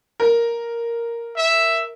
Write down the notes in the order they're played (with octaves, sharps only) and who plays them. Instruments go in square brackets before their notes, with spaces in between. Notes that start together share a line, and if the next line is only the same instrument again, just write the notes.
[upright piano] A#4
[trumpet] E5